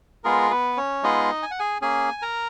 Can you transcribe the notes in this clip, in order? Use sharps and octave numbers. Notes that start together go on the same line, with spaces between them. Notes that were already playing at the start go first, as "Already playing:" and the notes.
G#3 B3 F4 G#4 A#4
B3 B4
C#4 C#5
G#3 B3 D#4 F4 G#4 D#5
G#5
F#5
G#4 G#5
A#3 C#4 G#4 G#5
A#4 A#5